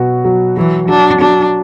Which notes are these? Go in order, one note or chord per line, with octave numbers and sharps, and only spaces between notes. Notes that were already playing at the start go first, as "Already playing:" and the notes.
Already playing: B2 F#3 F#4
F#3
E3 F#3
F#3 D4
F#3 D4